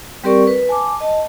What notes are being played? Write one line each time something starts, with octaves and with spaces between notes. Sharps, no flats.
G3 C4 G4 A#4 D5 C#6
B4
G#5 A5 D6
D#5 A5